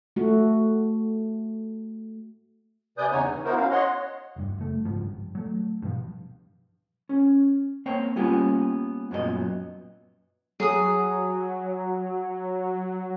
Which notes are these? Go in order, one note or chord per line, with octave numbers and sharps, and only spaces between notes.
A3 F#4
C3 B4 D5 G#5 D#6 G6
E2 C#3 B3 D#4 C#5 G#5
G2
B3 D#4 E4 F#4 A#4 C5
C#4 F5
C#5 D#5 F#5 C6
F1 G2
F#1 A3
G#1 C#2 G#2 F3
G2
F#3 A3
G2 B2 D3 F3
C#4
A#3 C4 C5 C#5 G5
G3 A#3 B3 C#4 F4 G4
F#2 A#2 F#3 B3 A#4 D#5
F#3 G#4 D#6